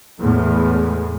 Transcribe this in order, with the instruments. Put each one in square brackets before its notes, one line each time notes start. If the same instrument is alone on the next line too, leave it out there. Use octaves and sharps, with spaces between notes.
[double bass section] E2 A2 G#3